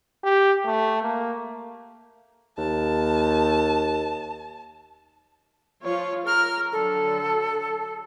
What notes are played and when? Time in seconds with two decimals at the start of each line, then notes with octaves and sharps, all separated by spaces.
0.24 G4
0.65 A3
1.02 A#3
2.58 D#2 A5
5.82 F3 F4 C#5
6.26 A#4 F6
6.72 D3 F#3 A4